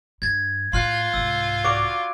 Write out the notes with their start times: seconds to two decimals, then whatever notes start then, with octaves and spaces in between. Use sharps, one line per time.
0.22 G2 G#6 A6
0.73 A2 F4 C6 F6 F#6
1.13 C2 G#2 E6
1.64 F#4 D5 F5 D6 D7